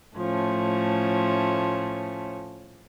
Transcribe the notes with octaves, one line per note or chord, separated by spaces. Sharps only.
A2 F3 A3 C#4